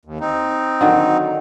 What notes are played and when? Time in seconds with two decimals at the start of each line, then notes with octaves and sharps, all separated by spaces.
0.05 D#2
0.20 C4 D#4
0.81 D3 D#3 F#3